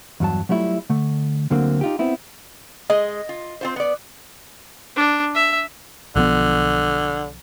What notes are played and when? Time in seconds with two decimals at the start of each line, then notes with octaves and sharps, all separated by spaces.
0.20 E2 G2 F#3 A5
0.49 F#3 G3 A3 E4 F4
0.89 D3 A3
1.50 D2 D3 F#3 A#3 C4
1.81 D#4 F4 G4
1.99 B3 C4 E4
2.90 G#3 D#5
3.29 F4
3.61 C4 F4 C5
3.76 B3 D5
4.96 D4
5.35 E5
6.16 B1 D3 F3 B3